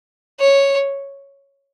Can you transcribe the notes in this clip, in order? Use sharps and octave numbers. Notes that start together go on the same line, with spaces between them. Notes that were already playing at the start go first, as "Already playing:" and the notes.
C#5